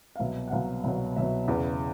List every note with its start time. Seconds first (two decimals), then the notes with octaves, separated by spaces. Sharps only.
0.16 F5
0.19 C2 B2 F#3 E5
0.48 F#5
0.51 C2 B2 F#3 F5
0.84 C2 B2 F#3
1.16 C2 B2 F#3 E5
1.48 E2 C#3 E3